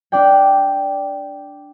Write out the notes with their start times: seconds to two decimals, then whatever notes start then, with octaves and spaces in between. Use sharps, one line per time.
0.12 D4 D5 G5